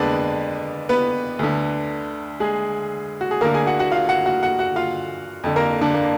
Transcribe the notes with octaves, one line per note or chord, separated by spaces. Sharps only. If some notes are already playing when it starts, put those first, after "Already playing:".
Already playing: F2 D3 G#3 A#3 B3 D4 B4 D5
B3 B4
D2 D3
G#3 G#4
F#4
G#4
D2 D3 A#3 A#4
G#4 G#5
F#4 F#5
F#4 F#5
F4 F5
F#4 F#5
F#4 F#5
F#4 F#5
F#4 F#5
F4 F5
F2 D3
A#3 A#4
D3 D4
A#3